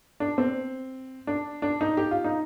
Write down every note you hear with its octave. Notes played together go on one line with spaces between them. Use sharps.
D4
C4
D4
D4
D#4
G4
F4
D#4